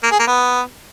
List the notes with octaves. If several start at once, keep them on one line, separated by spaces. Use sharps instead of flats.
A#3
G#4
A#3
B3